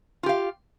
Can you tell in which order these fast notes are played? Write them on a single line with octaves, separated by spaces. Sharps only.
F4 G4 F5